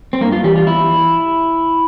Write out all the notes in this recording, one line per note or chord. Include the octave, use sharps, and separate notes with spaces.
C4
G2 A#3
F4
E3 G3 G4
F4
E2 E4